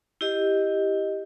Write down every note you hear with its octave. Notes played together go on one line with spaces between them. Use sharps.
E4 G4 D#5